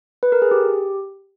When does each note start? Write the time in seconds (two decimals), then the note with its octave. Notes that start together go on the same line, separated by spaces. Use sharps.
0.23 B4
0.32 A#4
0.42 G#4
0.51 G4